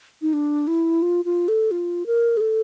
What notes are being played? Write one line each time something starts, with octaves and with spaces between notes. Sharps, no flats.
D#4
D4
E4
F4
F4
A4
F4
A#4
G#4
A4